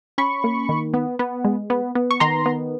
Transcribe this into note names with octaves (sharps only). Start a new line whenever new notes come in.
C#4 B5 C#6
A#3
D#3
B3
B3
G#3
B3
B3
C#6
D#3 A#5 C6
B3